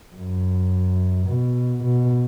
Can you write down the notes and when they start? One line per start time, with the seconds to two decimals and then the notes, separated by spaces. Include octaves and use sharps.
0.16 F#2
1.28 B2
1.84 B2